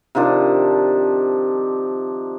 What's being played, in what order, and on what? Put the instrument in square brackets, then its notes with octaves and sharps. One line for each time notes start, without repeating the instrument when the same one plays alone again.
[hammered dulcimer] C3 D#3 F3 D4